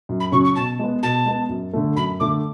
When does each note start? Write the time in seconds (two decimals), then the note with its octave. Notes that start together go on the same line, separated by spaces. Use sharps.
0.09 F#2
0.20 B5
0.31 C#3 F#3 C#4 C#6
0.44 C#6
0.55 B2 A5
0.79 G#3 B3
1.03 B2 A5
1.25 G#3 B3
1.49 F#2
1.73 D3 A3
1.96 F#2 B5
2.20 D3 A3 D6